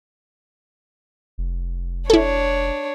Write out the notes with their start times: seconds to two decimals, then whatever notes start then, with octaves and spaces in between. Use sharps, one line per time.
1.38 F1
2.10 D4 E4 A4 C#5